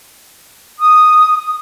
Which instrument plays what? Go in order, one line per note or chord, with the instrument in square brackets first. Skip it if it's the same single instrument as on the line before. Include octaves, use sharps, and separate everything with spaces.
[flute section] D#6